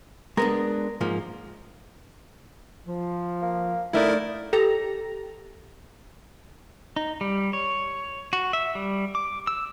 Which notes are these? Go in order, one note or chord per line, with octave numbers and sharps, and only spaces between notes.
G#3 B3 D4 A#4
G#2 F3 A#3
F3
A#3
D3 A3 D#4 E4 A#4 D5 E5
G4 A4 A#5
D#4
G3
C#5
F#4
E5
G3
D6
E6